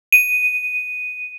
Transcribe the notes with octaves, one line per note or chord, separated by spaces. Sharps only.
D#7